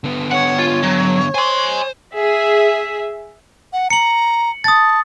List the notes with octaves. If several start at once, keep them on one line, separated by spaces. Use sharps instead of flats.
D3 B3
C#5 F#5
F4
F#3
C5 G#5 C6
G#4 E5
F#5
A#5 C#7 F#7
A5 D#6 A6